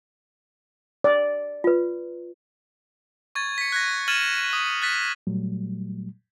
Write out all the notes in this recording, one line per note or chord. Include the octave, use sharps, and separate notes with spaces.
D5
F4 B4
C#6 G#6 A6
B6 C#7
F#6 G#6 A#6
F6 G#6 A6 D#7 E7 F#7
D#6
F#6 A6 B6
A#2 F#3 G3 A3